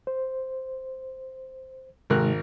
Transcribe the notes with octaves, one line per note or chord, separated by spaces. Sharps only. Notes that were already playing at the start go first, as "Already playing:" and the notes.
C5
G#1 C3 G#3 D#4 A#4 F#6